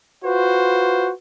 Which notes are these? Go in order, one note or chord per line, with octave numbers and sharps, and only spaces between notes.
F4 F#4 B4 C5